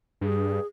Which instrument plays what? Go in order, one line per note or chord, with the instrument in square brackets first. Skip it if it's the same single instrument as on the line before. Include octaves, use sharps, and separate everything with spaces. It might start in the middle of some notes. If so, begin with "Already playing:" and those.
[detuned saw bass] G2 [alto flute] G#4